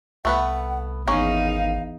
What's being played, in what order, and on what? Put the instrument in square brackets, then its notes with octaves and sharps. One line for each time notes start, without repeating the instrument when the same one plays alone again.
[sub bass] C2 [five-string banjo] A3 B3 B4 [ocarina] F#5
[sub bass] G#1 [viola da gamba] E2 D#4 [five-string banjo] A#3 C#4 G#4 [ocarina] F5